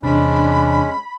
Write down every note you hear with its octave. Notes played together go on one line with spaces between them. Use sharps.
E2 C3 G#3 C#4 D4 B5